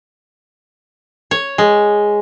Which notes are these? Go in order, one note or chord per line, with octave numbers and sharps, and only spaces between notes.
C#5
G#3